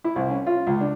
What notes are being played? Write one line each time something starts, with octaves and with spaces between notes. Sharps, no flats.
E4
C2
C#4
F4
C#2
D4